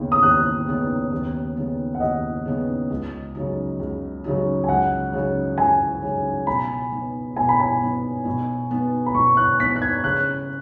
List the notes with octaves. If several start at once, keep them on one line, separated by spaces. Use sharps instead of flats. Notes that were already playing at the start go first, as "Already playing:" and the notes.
Already playing: D#2 C#3 B3 D#4
D#6
D#2 F#6
C#3 B3 D#4
D#2
C#3 B3 D#4
F#5
D#2 D#5
C#3 B3 D#4
C#2
C#3 F#3 D#4
C#2
C#3 F#3 D#4
G#5
C#2 F#5
C#3 F#3 D#4
C#2 G#5
C#3 F#3 D#4
B2 B5
B3 D#4
B2 G#5
B5
G#5
B3 D#4
B2
B3 D#4
B5
B2 C#6
F#6
B3 D#4 B6
F#6
G#6
C#3 F#6